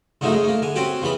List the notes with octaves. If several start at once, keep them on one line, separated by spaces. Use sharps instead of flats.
G#2 D3 F3 F#3 A3 D#4
C#3 G#3
A3 A#3
D3 G#5
C4 C#4 F#4 G4
C#3 E3 B3 B5